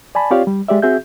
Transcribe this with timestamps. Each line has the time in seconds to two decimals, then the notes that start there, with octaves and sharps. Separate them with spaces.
0.15 D5 G#5 A5 B5
0.31 C4 F4 G4 C#5 D5 F5
0.47 G3
0.68 G#3 G4 D5 E5
0.82 C4 F#4 G#4 E5 G6